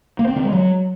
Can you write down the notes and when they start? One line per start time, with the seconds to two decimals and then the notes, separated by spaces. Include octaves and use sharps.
0.19 A#3
0.27 C4
0.36 D#3
0.44 G#3
0.53 F#3